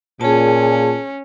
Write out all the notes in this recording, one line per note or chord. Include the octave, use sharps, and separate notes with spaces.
A#2 C#4 G#4 A5